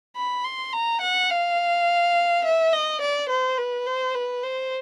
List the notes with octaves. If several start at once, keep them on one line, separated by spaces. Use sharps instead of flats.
B5
C6
A#5
F#5
F5
E5
D#5
D5
C5
B4
C5
B4
C5